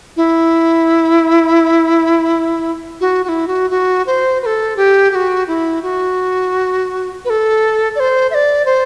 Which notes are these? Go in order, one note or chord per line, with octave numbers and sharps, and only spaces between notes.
E4
F#4
F#4
E4
F#4
F#4
C5
B4
A4
G4
G4
F#4
E4
F#4
B4
A4
D5
C5
E5
D5
C5